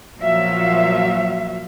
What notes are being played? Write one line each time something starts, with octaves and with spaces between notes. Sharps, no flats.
A#2 F3 F#3 F#4 E5 F5